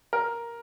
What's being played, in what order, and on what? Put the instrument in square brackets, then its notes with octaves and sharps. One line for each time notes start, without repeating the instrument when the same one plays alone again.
[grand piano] A#4